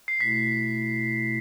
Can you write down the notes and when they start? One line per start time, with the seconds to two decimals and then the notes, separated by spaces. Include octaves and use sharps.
0.08 C7
0.20 B2 A3 E4 B6